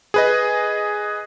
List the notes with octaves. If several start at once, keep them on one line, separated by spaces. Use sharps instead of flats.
G#4 B4 D#5